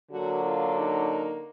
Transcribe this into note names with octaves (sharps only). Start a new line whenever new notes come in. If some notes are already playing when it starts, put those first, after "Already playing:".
D3 F#3 A#3 F#4
F4
D#4